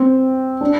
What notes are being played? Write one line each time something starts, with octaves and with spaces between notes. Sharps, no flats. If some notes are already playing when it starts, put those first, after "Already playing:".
Already playing: C4
D4